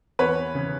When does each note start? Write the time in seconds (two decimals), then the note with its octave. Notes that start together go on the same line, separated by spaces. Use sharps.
0.19 E2 B4 C#5
0.55 C#3